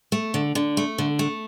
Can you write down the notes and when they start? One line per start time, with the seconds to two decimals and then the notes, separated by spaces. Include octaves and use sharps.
0.12 A3
0.34 D3
0.55 D3
0.77 A3
0.98 D3
1.19 A3